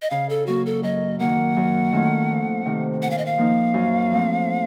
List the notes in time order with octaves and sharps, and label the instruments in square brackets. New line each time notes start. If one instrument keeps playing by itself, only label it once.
[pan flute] D#5
[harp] C#3 [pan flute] F5
[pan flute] A4
[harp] F#3 A#3 [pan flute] F#4
[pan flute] A4
[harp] F#2 [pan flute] D#5
[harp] D#3 F#3 A#3 [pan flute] F#5
[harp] F#2
D#3 A3 C#4 F4
F2
C3 D#3 A3
[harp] A#2 [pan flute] F#5
[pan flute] F5
D#5
F5
[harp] F3 A#3 D#4
F#2
F3 A3 C4